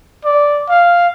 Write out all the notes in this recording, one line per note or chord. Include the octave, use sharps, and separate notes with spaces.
D5
F5